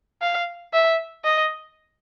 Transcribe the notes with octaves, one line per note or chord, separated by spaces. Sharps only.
F5
E5
D#5